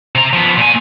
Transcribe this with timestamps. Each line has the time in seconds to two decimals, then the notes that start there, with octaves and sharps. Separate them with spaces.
0.15 C3 A#5
0.33 F3 B3
0.58 A#2 G#5